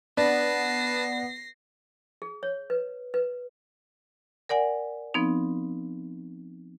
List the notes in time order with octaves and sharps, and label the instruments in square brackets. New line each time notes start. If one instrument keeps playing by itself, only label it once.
[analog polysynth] B3 [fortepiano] D4 [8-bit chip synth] B4 A5 [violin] A#6 C7
[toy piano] G#4
C#5
B4
B4
[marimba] A#4 D5 F#5 G#5
F3 B3 C4 D#4